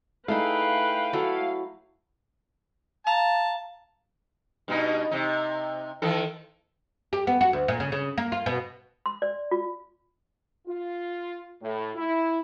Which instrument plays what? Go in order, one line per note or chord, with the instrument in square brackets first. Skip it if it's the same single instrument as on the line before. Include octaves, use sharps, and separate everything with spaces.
[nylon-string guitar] A3 [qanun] D#4 E4 G#4 [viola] B4 G5 [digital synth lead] F5
[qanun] F#3 E4 A4
[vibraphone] F5 A#5 [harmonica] A5
[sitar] G2 B2 D#4
C3 D#4
D#3 E3 A4
[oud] G4
B3
F#4
D2
A#2
C#3
C#3
A#3
F4
B2
[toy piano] C6
D5
F4
[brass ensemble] F4
A2
E4